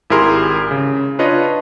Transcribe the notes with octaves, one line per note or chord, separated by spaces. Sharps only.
G#1 E4 G4 G#4 A#4 C6
C#3
D4 F4 B4 C#5 D#5